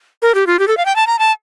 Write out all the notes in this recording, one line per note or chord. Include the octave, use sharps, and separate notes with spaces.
A#4
G4
F4
G4
A4
F5
G5
A5
A#5
A5